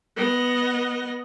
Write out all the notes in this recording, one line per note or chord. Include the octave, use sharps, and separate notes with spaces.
B3 D#5